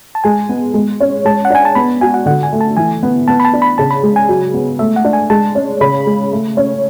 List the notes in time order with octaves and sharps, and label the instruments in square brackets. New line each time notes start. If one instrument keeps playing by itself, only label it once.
[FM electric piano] A5
[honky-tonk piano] G#3 [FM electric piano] G#5
[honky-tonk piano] B3
G#3
C#4
[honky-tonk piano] G#3 [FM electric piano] A5
[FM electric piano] F#5
[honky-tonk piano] D4 [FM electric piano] G#5
[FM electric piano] A5
[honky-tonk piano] B3 [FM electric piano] B5
[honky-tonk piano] F#4 [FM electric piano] G#5
[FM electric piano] F#5
[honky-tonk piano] D3 [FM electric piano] F#5
[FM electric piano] G#5
[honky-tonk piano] A3
[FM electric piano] A5
[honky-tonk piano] E3 [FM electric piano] G#5
[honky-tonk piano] B3
[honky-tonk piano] B3 [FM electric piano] A5
[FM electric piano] B5
A5
[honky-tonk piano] D4
[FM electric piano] B5
[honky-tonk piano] C#3 [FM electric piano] A5
[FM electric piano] B5
[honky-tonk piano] G#3
[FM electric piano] G#5
[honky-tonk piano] F#3
B3
[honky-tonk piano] A3 [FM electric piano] E5
[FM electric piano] F#5
[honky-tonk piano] D4
[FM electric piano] G#5
[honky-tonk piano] G#3 [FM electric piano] A5
[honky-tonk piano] C#4
[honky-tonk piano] C#3 [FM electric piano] B5
[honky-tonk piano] G#3
A3
C#4